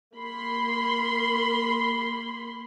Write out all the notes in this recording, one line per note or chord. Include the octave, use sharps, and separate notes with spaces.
A#3 B5 C6